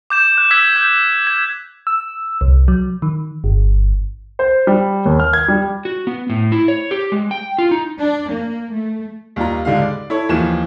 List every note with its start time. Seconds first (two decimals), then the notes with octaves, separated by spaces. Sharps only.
0.10 D6 G6 E7
0.38 F#6
0.51 E6 G#6 B6
0.76 G6
1.27 G#6
1.87 E6
2.41 C2
2.68 F#3
3.02 D#3
3.44 G1
4.39 C5
4.67 G3
5.05 D#2
5.20 F6
5.33 G#6
5.48 G3
5.85 F#4
6.07 B3
6.30 A2
6.52 E4
6.68 C#5
6.91 G4
7.12 G#3
7.31 G5
7.58 F4
7.71 D#4
8.00 D4
8.31 A#3
8.72 A3
9.36 D#2 G3 F4 A#5
9.65 G#2 D3 G3 F5
9.82 D5
10.10 E4 A4 C#5
10.29 D#2 E3 F3 E7